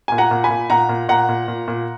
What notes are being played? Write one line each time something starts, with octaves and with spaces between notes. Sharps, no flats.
A#2 G#5
F#5 A#5
A#2
G#5 B5
A#2
A#2 F#5 A#5
A#2
A#2 F#5 A#5
A#2
A#2
A#2